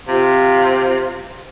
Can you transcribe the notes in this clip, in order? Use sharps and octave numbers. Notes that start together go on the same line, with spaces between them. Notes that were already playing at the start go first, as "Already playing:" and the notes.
C3 F4 F5